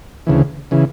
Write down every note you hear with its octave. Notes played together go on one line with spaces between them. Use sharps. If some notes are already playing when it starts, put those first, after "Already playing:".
D2 C#3 E3
C#3 E3